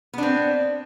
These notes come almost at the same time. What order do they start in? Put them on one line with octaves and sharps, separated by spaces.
B3 D4 C4